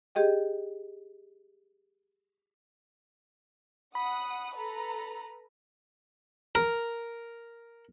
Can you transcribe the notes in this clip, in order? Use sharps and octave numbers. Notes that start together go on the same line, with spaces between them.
G4 G#4 D#5 G5
F#5 B5 D#6 F#6
A4 B4 A#5
A#4